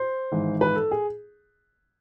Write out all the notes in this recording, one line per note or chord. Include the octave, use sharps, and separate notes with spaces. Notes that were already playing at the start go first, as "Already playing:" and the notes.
Already playing: C5
G#1 G#2 E3
B4
A4
G#4